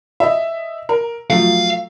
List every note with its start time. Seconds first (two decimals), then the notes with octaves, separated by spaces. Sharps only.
0.20 D#5 E5
0.89 A#4
1.30 F3 F#3 A3 F5